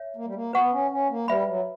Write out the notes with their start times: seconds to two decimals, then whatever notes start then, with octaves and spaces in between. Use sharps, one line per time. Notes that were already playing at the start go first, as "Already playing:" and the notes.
Already playing: C#5 E5
0.16 A#3
0.25 G3
0.35 A#3
0.53 B3 B4 F#5 C#6
0.72 C#4
0.91 C#4
1.10 A#3
1.27 G3 B4 E5 B5
1.46 F#3